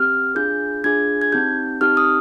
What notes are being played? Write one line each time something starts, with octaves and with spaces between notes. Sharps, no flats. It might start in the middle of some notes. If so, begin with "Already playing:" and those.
Already playing: C4 G4 F6
D4 F4 G#4 G6
D4 F4 G#4 G#6
G#6
C4 D#4 G4 G6
C4 D#4 G4 F6
D#6